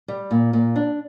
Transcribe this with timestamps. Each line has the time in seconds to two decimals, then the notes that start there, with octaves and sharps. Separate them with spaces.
0.08 G3
0.31 A#2
0.53 A#2
0.76 D4